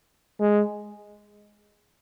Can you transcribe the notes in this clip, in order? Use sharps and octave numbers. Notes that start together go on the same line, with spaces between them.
G#3